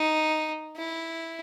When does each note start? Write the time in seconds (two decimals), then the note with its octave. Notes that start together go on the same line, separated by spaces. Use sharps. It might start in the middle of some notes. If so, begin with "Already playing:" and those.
Already playing: D#4
0.77 E4